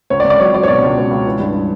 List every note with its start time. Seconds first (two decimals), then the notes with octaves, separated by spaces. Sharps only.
0.10 C#2 C#5
0.20 D5
0.24 C#2
0.30 D5
0.39 F#3 C#5
0.54 F#3 D5
0.63 C#5
0.68 B2 D5
0.82 C#2
0.96 C#2
1.11 C#2
1.26 E3
1.40 G2